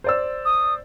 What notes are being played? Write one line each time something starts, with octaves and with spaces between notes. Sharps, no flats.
C5 D5 E6
D#6